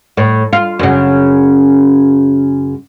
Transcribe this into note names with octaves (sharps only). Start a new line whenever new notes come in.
A2
F4
F#2 C#3